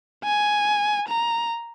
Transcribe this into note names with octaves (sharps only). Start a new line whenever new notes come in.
G#5
A#5